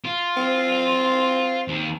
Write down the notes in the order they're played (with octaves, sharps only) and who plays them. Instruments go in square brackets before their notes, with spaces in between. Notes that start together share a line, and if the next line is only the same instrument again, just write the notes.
[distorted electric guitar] F4
[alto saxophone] C4
[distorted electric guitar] D#2